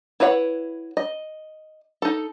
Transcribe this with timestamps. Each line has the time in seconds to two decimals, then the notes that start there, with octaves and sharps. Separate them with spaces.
0.20 E4 B4 C#5 F5 F#5
0.97 D#5
2.02 D#4 A4